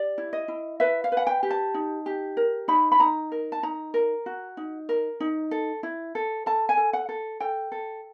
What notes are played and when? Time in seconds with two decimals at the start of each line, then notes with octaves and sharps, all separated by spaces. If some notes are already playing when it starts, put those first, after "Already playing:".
Already playing: G4 D5
0.18 E4
0.33 D#5
0.48 E4
0.80 B4 E5
1.04 F5
1.12 B4
1.17 F#5
1.27 G5
1.43 G4
1.51 A5
1.74 D#4
2.06 G4
2.37 A#4
2.68 D#4 B5
2.92 B5
3.00 D#4 A#5
3.32 A#4
3.52 A5
3.63 D#4 A#5
3.94 A#4
4.26 F#4
4.57 D#4
4.89 A#4
5.20 D#4
5.51 A4
5.83 E4
6.15 A4
6.46 A4 A5
6.69 G#5
6.77 A4
6.93 F#5
7.09 A4
7.40 A4 G5
7.72 A4